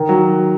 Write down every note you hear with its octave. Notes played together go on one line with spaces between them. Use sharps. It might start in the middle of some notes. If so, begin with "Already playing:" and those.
Already playing: D#3
F#3